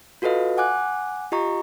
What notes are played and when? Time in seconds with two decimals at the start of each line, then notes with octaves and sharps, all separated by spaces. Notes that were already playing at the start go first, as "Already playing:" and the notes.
0.22 F4 F#4 A4 B4 D#5 F5
0.58 F#5 G#5 D6 F#6
1.32 F4 G4 D#5 A#5 C#6